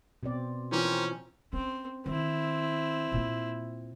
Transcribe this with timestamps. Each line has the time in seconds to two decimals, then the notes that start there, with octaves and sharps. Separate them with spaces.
0.23 B2 C4 D5
0.72 E3 F3 C#4 G4 A#4 C5
1.53 C4 C#4
2.06 D#3 C4 E4
3.12 A#2 A#3